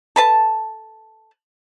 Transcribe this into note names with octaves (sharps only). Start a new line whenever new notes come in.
A4 B4 A5